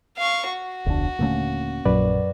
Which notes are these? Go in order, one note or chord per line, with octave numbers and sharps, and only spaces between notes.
F5 C#6
F#4
E1 C#2 D4
D#1 D3 A3 A#3 C#4
A#1 F#2 B4 D5